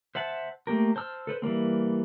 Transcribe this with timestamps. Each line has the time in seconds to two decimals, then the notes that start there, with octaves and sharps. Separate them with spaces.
0.15 C5 E5 F#5 A5
0.67 A3 A#3 G4 A#4
0.96 C5 A5 E6 F6
1.27 A4 B4 C5
1.42 E3 G3 A#3 C4